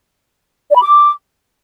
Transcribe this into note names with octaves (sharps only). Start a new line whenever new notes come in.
D5
B5
D6